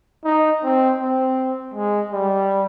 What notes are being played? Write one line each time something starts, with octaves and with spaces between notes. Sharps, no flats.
D#4
C4
C4
G#3
G3